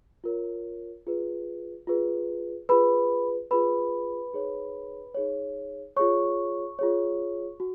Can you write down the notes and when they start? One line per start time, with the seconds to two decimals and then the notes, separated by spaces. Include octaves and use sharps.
0.24 F4 A#4 C#5
1.07 F4 G#4 B4
1.87 F4 G#4 B4
2.69 F4 G#4 B4 B5
3.51 F4 G#4 B4 B5
4.33 D#4 G#4 C#5
5.14 D#4 G#4 C#5
5.96 F4 G#4 C#5 C#6
6.79 F4 G#4 C#5
7.60 F#4